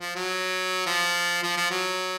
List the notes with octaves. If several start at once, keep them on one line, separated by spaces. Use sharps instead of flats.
F3
F#3
F3
F3
F3
F#3